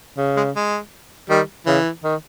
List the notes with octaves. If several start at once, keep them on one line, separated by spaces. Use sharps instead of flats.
C#3
G#3
G#3
D#3 G3
C#3 E3
D#3